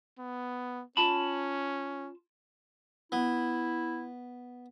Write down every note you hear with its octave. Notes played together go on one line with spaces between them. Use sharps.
B3
C#4 F4 A5 B5
B3 E4